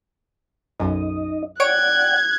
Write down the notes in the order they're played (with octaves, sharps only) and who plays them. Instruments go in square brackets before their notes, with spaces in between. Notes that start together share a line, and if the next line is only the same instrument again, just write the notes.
[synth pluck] B1 F#2 [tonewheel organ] D#4 D#5
[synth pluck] C#5 D7 [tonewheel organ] D5 F#5 G5 [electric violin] F#6 G#6